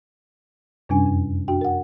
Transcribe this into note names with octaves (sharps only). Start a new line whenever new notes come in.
F#2 C3 G3 C#4 D4 G#5
F2
D4 F#4 G5
A#4 F#5